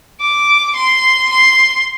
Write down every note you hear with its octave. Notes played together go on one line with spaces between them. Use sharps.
D6
C6
C6